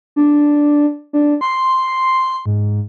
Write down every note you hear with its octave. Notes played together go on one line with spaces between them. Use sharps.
D4
D4
C6
G#2